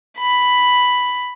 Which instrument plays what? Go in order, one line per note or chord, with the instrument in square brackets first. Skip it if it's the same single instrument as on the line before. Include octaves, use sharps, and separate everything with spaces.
[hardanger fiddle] B5